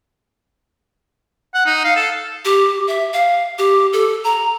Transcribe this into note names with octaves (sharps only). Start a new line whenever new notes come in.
F#5
D#4
F5
A4
G4
E5
F5
G4
A4
A#5